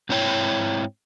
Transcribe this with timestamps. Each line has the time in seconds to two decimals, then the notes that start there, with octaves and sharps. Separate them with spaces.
0.09 G#2 C4 E4 C#5 G5